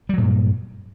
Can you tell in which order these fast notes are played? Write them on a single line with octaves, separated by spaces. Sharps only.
G3 F#3 A#2 G2